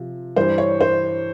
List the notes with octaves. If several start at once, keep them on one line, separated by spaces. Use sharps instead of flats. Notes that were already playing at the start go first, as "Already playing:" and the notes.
Already playing: C3 F3
G2 E3 G3 C5
C#5
C5